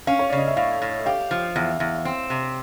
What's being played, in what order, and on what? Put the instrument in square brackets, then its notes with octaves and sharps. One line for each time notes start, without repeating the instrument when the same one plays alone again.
[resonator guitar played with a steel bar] C#4 [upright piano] F5
[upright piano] C#5
[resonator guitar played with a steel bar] C#3 [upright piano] D5
[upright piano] D#5
E5
[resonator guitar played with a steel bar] A2 [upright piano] F5
[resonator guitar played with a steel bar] A2
[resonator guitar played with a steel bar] G4 [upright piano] F5
[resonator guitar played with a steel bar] F3
E2
E2
C4
C3